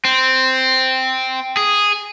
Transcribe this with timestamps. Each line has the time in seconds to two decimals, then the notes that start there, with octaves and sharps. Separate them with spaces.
0.05 C4
1.57 G#4